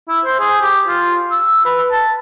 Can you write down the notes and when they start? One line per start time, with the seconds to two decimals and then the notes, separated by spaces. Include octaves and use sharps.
0.09 E4
0.25 C5
0.40 G#4
0.62 G4
0.88 F4
1.31 E6
1.65 B4
1.92 A5